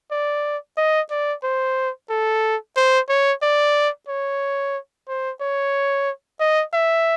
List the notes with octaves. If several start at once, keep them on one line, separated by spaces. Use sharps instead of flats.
D5
D#5
D5
C5
A4
C5
C#5
D5
C#5
C5
C#5
D#5
E5